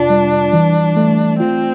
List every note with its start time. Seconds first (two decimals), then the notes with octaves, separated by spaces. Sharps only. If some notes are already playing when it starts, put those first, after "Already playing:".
Already playing: F2 C3 D4 F4
0.10 G3
0.53 E3
0.97 A3
1.39 C4 F4